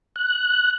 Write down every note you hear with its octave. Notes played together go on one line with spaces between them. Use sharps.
F#6